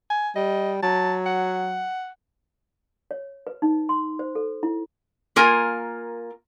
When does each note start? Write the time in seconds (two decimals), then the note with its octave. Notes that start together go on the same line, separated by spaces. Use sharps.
0.10 G#5
0.36 G3 D#5
0.83 F#3 A5
1.26 F#5
3.11 C#5
3.47 B4
3.62 D#4
3.89 C6
4.19 C5
4.35 A4
4.63 E4
5.36 A#3 F4 A#4 G#5